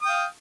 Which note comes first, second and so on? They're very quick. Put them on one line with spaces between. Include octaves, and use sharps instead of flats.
D#6 G5 F5